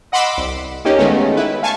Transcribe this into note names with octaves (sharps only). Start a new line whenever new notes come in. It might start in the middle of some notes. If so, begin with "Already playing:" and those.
D#5 F#5 B5 C6 D6 E6
C2
A#3 C#4 D#4 G4
D#3 G#3 A3 B3 C#4
E4 B4
F5 G#5 A5 C#6